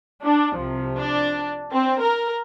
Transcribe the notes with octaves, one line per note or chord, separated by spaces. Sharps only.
D4
C2 C3 F3
D4
C4
A#4